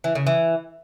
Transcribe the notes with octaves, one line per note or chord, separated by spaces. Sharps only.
E3
C#3
E3